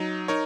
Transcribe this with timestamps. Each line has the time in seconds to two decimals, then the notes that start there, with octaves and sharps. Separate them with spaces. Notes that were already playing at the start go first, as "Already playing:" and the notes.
Already playing: F#3 D#4
0.28 D#4 A#4 C#5